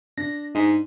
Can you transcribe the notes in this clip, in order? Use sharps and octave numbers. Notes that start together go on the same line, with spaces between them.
D4 A#6
G#2 D#4